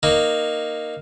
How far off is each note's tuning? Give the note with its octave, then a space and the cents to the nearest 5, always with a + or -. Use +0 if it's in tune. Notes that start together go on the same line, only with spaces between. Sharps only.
A#3 +0 D#4 -15